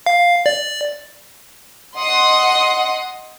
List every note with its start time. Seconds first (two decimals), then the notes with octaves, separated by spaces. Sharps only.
0.06 F5
0.46 D5
1.98 D#5 F#5 C6 D#6